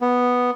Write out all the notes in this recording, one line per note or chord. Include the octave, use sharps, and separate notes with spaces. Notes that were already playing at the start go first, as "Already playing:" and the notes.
B3